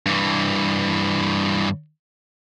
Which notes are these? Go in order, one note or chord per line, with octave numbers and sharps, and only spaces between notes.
G2 E3